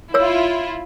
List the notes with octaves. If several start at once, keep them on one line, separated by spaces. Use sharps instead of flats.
E4 F4 C#5 E6